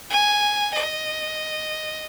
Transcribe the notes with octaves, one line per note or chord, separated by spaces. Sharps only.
G#5
D#5